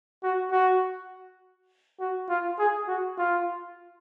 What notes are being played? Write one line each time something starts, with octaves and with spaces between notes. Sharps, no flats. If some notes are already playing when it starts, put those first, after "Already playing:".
F#4
F#4
F#4
F4
G#4
F#4
F4